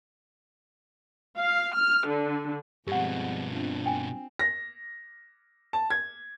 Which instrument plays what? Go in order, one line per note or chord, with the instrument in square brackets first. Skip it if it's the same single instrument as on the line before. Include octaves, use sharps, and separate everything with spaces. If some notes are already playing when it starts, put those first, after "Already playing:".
[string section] F5
F6
D3
[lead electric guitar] G2 B2 [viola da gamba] F3 G#3 C4 [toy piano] G4 F#5
[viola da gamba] C4 D4 F4
[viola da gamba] C4 [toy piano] G5 G#5
[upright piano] A#6
A5
G#6